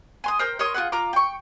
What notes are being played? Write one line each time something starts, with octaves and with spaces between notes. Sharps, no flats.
G#5 C6 D#6
A#4 C5 G5
A#4 C#5 C6 D#6
F4 F#4 G#4 F#5
F4 A#5 D6
G5 C#6